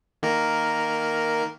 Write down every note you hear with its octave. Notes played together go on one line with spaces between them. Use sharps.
D#3 A#3 A#4